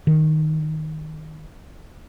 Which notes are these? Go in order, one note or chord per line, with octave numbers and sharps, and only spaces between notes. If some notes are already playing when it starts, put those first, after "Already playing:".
D#3